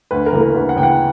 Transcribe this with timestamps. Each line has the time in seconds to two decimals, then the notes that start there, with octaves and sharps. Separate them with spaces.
0.11 D2 B4
0.26 A#4
0.33 C#3 E3 A#3
0.41 A#4
0.54 D2 B4
0.69 F#5
0.76 C#3 E3 A#3 G5
0.83 F#5